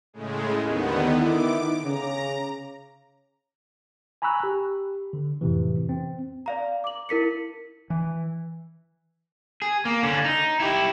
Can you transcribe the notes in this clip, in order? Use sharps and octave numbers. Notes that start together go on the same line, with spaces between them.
A2 C#3 G#3
D#2 D3 D#3 B3
D#3 D#4 E4 D6
C#3 A#5
G#5 A#5 B5 C#6 E6 F#6
G4
D3
F2 A2 C3 E3
C4
D5 F5 A#5
D6 F#7
E4 A#4 B6 C#7
E3
G#4
A#3
D3 C#4
D#4
E4 G4